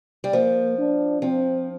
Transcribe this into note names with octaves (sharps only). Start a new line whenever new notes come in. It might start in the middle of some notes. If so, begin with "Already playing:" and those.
G3
F3 A#3
D4
F3 C4